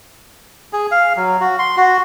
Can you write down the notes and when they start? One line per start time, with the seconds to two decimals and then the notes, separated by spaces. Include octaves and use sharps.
0.73 G#4
0.91 F5
1.17 F#3
1.40 F#4
1.59 C6
1.77 F#4